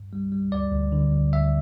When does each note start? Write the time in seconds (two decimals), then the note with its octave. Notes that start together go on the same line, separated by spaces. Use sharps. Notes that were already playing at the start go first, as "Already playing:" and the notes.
Already playing: G2
0.13 G3
0.32 G3
0.52 D2 D5
0.73 D2
0.92 D3
1.13 D2
1.32 D2 E5